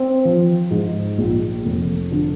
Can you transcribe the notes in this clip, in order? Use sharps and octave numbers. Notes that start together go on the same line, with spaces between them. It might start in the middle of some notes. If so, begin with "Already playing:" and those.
Already playing: C4
F3
G#2
A#1
F1
D3